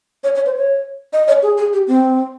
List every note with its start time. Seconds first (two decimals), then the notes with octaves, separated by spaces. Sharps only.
0.24 C#5
0.35 C#5
0.46 C5
0.57 C#5
1.13 D#5
1.28 C#5
1.42 G#4
1.58 G#4
1.73 G4
1.88 C4